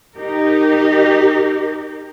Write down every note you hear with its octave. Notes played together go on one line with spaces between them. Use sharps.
D#4 G4 A#4